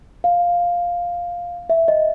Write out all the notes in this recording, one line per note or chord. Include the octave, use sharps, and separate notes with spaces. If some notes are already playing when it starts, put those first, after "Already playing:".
F5
E5
D#5